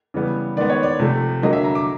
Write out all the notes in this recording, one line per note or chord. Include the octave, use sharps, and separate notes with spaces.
C#3 E3 G3 B3
D#3 G#3 B3 D5
C#5
D5
C3 F3 A3
D3 F#3 A#3 D#5
E5
A#5
D6